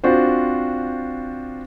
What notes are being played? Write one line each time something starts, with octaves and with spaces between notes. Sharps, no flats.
C4 D4 F4 F#4 C5